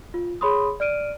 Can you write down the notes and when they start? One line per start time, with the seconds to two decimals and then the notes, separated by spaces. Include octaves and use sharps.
0.14 F4
0.41 G#4 C#5 B5 C6 D#6
0.80 D5 F6 D7 D#7